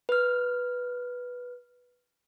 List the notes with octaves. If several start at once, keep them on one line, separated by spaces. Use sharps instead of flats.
B4 F6